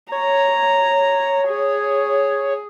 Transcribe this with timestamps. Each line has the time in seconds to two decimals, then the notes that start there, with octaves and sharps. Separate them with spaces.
0.12 C#5 A#5
1.48 G#4